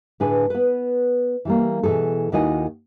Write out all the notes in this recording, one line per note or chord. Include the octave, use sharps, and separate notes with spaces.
A2 D3 D4 G#4 B4 G#5
B3 B4
E3 G3 A#3
B2 E3 F3 G#4 A4
D#2 D#3 E4 F#4 D#5 G#5